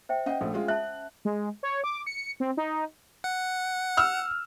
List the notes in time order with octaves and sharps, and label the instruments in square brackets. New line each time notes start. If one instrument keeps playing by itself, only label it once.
[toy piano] C5 E5 G5
[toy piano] C#4 F#5 [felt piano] D#5 G5
[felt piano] A#1 A3 [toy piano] D#6
[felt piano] G#3 F4
[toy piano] E5 A5 [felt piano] F#6
[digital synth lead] G#3
C#5
D6
C#7
C4
D#4
[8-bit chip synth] F#5
[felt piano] E6 F6